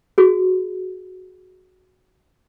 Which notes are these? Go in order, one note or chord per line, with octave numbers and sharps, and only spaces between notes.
F#4 G#4